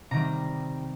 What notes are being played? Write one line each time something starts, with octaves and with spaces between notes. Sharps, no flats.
C3 D#3 G3 A#5